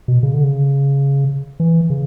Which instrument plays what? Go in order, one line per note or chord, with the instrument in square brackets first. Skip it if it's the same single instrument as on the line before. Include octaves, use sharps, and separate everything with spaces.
[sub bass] B2
C#3
D3
C#3
E3
C#3